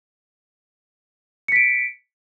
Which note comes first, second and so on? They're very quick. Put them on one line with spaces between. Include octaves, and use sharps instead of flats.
C#7 B6 D7